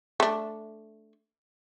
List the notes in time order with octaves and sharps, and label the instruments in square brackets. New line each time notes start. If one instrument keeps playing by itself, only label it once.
[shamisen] A3 D4